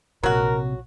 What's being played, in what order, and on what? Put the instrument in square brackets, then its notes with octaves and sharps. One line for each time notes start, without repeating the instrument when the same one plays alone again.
[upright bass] A#1 C3 [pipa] F#3 F#4 [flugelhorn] A#4